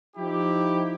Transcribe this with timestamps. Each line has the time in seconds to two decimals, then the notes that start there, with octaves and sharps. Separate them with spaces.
0.16 F3 D#4 E4 G4